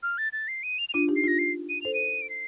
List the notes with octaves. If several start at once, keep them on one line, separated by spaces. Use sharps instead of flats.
F6
A6
A6
C7
D#7
F7
F7
D4 F4 D#7
D#4 G4
C7
D4 F4 A#6
C7
D#7
A4 C5 F7
D#7
D7
C7